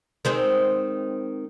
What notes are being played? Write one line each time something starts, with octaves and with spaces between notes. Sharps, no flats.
D#3 G#3 C4